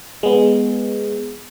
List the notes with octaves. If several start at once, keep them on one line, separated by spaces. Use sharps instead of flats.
G#3 B3